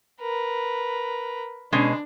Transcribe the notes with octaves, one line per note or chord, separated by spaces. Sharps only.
A#4 B4
B2 G#3 C#4 D4